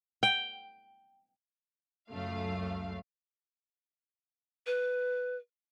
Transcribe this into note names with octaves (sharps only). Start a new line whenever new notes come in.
G5
C#2 F#2 A3 F5
B4